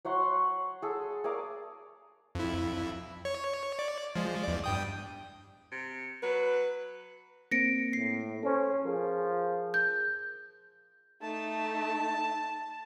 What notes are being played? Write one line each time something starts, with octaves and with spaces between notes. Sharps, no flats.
F#3 C#5 F#5 C6
G#4 A4
G#4 A#4 D5 F5
F2 E4
C#5
D5
F3 G#3
E2 D5
G2 G5 D#6
C3
F#3 B4
A#3 C4 A#6 C#7 D7
A2 C7
C#4 A4 C5
F3 G#4 A#4
G6
A3 D#4 A5